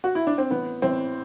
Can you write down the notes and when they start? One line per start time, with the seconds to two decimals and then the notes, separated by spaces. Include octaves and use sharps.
0.04 F#4
0.15 E4
0.27 D4
0.38 C4
0.51 A1 B3
0.82 A1 C4